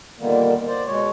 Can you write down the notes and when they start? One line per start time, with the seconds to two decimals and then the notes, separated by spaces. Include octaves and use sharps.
0.20 A#2 D3 D#3 G3 A#3 B3
0.67 C5 D5
0.87 B2 G#3 C#5